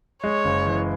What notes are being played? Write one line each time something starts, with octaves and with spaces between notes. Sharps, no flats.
G#3 C#5
F#1
E3